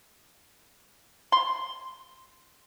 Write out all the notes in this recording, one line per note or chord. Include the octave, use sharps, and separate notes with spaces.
C6